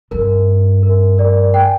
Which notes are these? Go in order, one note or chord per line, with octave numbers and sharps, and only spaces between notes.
G2 A#4
A#4
A#4 D5
G5
G#5